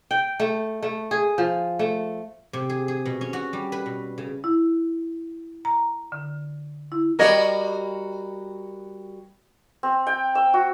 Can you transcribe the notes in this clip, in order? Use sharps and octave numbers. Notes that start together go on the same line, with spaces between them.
G5
A3
A3
G#4
F3
A3
C3
G#4
G#4
B2
C#4
F#4
G3
B4
B2
C#3
E4
A#5
D3
E4
G3 F#4 G4 A#4 C#5 D#5
C4
G5
E6
F#4